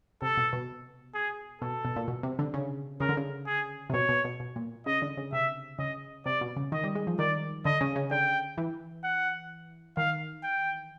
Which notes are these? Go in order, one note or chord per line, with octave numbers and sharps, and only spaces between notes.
C3 A4
B2
B2
G#4
B2 A4
B2
A#2
B2
C3
D3
C#3
C#3 A#4
D3
C#3
G#4
C3
B2 C#5
B2
B2
B2
A#2
C#3 D#5
D3
C#3
C3 E5
C#3 D#5
C3 D5
B2
C#3
D#3 D#5
G3
G#3
F3
D#3 D5
D3 D#5
C#3
C#3
D3 G5
E3
F#5
D#3 F5
G5